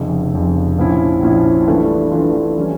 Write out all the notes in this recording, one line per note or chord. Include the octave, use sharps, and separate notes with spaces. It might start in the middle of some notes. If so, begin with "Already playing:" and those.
Already playing: F1 F2 C#3
F1 F2 C#3
A#1 A#2 F3 C#4 E4
A#1 A#2 F3 C#4 E4
G2 E3 A3 D4 F4
G2 E3 A3 D4 F4
E3 G3 C#4